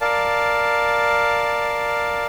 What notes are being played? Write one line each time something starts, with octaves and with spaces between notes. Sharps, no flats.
A#4 D5 F5 A5